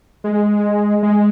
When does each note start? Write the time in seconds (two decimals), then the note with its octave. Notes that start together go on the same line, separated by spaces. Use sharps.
0.24 G#3
1.03 G#3